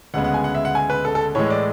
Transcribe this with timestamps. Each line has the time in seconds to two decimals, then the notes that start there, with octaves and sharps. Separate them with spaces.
0.14 D2 C#3 G#3 B3 F#5
0.24 F#5
0.34 G#5
0.44 F#5
0.55 E5
0.65 F#5
0.75 G#5
0.90 B4
1.05 A4
1.15 A4
1.35 A2 E3 G#3 C#5
1.50 D5